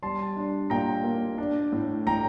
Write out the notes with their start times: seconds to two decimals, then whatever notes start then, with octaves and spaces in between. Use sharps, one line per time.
0.02 G3 A5 C6
0.36 D4
0.70 A#2 G5 A#5
1.04 A#3
1.38 D4
1.72 A2
2.07 A2 G5 A#5